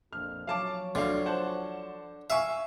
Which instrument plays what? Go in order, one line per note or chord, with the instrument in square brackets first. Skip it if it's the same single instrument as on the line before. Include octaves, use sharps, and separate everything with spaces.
[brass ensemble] A#1 F2 [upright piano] F6
[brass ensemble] F3 F#3 C#5 [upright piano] F5 A5 D6
[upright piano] D2 F5 [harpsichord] D3
[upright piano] C5 F#5 A5
[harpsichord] E5 [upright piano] F5 G#5 C#6